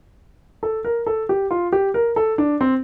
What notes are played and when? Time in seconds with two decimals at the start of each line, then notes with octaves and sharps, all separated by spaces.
0.63 A4
0.85 A#4
1.06 A4
1.29 G4
1.51 F4
1.72 G4
1.94 A#4
2.16 A4
2.38 D4
2.61 C4